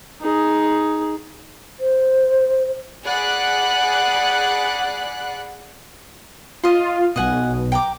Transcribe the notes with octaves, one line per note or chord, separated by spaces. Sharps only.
D#4 G#4
C5
G#4 D5 F#5 B5 F#6
F4 D#5 C6
B1 B2 D#5 F#5 G#5
G5 A#5 D6